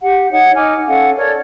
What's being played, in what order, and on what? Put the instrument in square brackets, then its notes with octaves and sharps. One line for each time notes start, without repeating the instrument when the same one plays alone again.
[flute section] G4 F#5
D#4 C#5 F#5
D#4 G#5 D6 F6
C#4 A4 F5 F#5
A4 A#4 C#5 D5